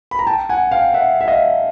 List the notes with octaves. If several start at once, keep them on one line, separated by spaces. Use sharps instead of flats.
B5
A#5
G5 A5
F#5 G#5
F5 G5
E5 F#5
E5
D#5 F5